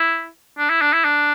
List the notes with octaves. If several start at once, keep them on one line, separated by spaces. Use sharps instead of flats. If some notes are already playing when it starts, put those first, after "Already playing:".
Already playing: E4
D4
E4
D4
E4
D4